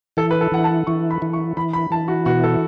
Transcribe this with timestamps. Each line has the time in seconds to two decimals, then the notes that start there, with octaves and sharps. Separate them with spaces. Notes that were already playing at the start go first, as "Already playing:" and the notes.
0.17 E3 A4
0.31 B4
0.41 A4
0.52 E3 F#5
0.64 A5
0.87 E3 C#6
1.11 B5
1.22 E3
1.33 C#6
1.57 E3 B5
1.73 B5
1.91 E3 A5
2.08 F#4
2.26 B2 F#4
2.44 A4